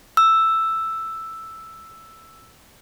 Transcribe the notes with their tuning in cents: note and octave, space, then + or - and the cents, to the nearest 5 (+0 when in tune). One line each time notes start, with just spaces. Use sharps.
E6 +5